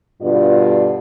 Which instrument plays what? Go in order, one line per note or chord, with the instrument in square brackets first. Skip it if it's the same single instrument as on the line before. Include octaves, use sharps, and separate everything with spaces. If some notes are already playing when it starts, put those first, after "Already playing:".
[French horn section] G2 B2 D3 F4 D5